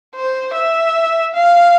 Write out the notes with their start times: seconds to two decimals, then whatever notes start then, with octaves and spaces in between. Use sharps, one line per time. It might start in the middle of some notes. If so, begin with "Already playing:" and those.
0.16 C5
0.55 E5
1.34 F5